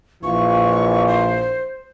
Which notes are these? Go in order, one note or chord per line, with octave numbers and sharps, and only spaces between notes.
A#1 E3 F4 C#6
C5